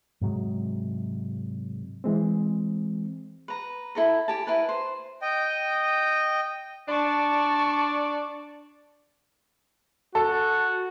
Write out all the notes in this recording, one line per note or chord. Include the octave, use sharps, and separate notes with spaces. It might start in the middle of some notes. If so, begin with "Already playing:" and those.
G#2 C3 F#3 G#3
E3 G#3 C4
B4 A#5
E4 A4 A#5
G4 G#5 A5
E4 A#4 B4
C5
D#5 G5
D4 D5 A5 C#6
F#4 A4